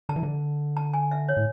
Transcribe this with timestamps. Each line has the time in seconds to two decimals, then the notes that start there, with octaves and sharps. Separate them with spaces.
0.09 D3 A5
0.16 E3
0.23 D3
0.77 A5
0.94 G#5
1.11 E5
1.29 C#5
1.37 A2